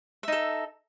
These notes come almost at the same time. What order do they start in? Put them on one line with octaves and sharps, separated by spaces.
E5 D#4 A4